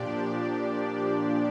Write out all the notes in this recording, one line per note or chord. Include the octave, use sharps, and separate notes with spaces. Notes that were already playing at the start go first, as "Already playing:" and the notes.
Already playing: A#2 F3 D4 G4 D5